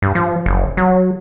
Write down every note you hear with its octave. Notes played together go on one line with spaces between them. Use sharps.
G2
F3
F#1
F#3